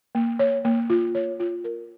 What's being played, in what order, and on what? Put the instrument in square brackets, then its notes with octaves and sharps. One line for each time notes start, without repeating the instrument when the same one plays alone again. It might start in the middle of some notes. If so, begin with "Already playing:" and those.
[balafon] A#3
C#5
A#3
F4
C#5
F4
A#4